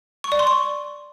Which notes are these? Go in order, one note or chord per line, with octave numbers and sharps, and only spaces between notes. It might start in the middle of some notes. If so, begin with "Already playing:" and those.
C#6
D5
C6
C#6